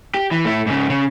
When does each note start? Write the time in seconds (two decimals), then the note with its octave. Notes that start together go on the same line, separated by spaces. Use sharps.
0.14 G4
0.31 E3
0.45 A3 E4
0.66 G#2 C#3
0.90 C#3